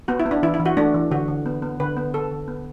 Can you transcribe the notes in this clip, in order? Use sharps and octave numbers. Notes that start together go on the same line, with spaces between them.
B3 F#4
E4
B3
D4
E3 E4
E4
E3
F#4
A3 D4
E3
D3 F#4
D3
B3
B3
D3 B4
B3
D3 A4
D3
B3